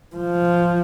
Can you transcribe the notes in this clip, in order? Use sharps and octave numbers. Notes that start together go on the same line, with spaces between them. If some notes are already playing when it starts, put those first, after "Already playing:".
F3